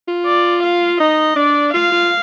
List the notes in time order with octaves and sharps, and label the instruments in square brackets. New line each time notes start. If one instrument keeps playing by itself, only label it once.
[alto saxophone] F4
[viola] D5
F5
[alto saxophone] D#4 [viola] D#5
[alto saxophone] D4 [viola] D5
[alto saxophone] F4 [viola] F5
[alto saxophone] F4